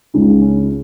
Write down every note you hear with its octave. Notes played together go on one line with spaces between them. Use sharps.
C#2 C#3 G#3 D#4
C#4